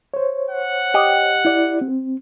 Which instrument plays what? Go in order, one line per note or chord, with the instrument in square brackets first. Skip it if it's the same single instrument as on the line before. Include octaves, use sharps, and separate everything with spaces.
[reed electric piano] C5 C#5
[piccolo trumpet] F#5
[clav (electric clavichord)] G4 D#5
[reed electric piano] E4 D5
C4